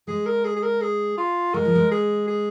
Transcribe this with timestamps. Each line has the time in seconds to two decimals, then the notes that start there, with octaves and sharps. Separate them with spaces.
0.07 G#3 G#4
0.26 A#4
0.44 G#4
0.56 G#4
0.63 A#4
0.81 G#4
1.18 F4
1.54 G#3 A#4
1.65 F3
1.75 G#3
1.91 G#4
2.28 G#4